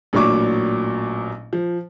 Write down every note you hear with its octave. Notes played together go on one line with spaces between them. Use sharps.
A1 A#2 F#3 D4 C#6 D6
F3